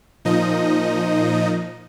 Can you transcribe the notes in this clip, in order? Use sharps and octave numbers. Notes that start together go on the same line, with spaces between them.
A#2 F3 D#4 D#5